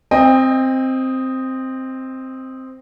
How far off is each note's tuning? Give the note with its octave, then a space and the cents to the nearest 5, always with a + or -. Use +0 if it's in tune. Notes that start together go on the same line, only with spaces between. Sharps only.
C4 +0 D#5 +0 G5 +30